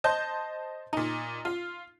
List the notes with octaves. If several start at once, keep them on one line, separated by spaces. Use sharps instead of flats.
C5 D#5 A5 G6
A#2 D#4
F4